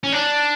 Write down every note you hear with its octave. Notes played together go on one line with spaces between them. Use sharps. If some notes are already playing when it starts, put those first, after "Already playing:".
C#4
D4